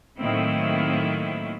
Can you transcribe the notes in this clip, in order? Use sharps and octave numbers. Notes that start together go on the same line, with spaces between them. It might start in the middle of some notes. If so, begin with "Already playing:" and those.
A2 D#3 F#3 A#3 C4 E4